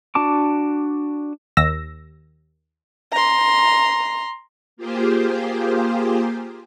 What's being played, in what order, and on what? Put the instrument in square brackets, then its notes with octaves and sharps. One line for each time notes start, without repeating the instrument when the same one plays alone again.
[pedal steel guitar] D4 F#4 A5 D6
[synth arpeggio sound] D#2 E6 A#6
[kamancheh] A#5 C6
[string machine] A#3 F4 G4 G#4 C5